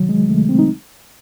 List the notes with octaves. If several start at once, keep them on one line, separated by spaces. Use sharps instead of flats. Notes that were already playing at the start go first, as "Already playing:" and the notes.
Already playing: C#2 C3 D#3 F#3
G#3
C#2 C3 D#3 A3
C4
D#4